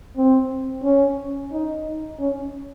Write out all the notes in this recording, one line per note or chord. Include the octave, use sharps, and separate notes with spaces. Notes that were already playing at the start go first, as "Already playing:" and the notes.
C4
C#4
D#4
C#4